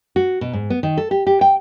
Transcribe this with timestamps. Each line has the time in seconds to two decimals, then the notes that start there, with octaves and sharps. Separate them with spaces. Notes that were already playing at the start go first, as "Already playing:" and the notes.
0.16 F#4
0.41 B2
0.53 G#2
0.70 B3
0.83 D#3
0.97 A4
1.11 G4
1.27 G4
1.41 G5